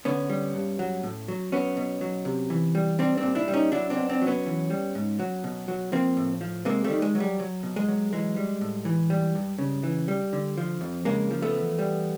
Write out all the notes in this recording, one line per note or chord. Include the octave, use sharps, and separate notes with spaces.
D3 B3 C#4
G3
G2
F#3
A2
F#3
F#3 B3 C#4
B2
F#3
C3
E3
G3
G3 C4 D4
C4 D4
A#2
D4 E4
G3
C#4 D#4
F#3 D4 E4
C4 D4
B2
C4 D4
F#3
B3 C#4
E3
G3
G#2
F#3
B2
F#3
F3 A#3 C4
A2
F3
C3 G#3 A#3
G3 A3
D#3
G#3
F#3
G3
F#3
B2
G#3
F#3
E3 G#3
G3
A2
E3
G3
G2
C#3
E3
G3
D3
F3
F2
C#3 G#3 A#3
F3
A3 B3
E2
G3